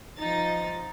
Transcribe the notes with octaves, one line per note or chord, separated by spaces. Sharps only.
F3 D#4 A6